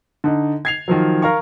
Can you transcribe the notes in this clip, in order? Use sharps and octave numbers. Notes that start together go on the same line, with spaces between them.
D3 D#4
G#6 C7 F7
D#3 F3 F#3
A#4 F5 A#5 C#6